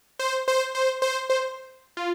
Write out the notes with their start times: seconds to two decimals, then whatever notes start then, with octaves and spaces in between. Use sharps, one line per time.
0.19 C5
0.48 C5
0.75 C5
1.02 C5
1.30 C5
1.97 F4